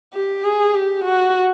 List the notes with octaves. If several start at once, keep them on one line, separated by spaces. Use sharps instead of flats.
G4
G#4
G4
F#4